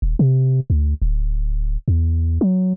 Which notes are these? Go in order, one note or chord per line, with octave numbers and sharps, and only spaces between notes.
D#1
C3
D2
D1
E2
F#3